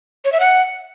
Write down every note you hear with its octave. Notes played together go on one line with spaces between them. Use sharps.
C#5
E5
F#5